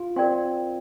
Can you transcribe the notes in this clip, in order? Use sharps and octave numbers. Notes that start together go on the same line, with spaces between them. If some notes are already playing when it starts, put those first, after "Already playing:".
Already playing: F4
C4 A#4 D5 G5 C6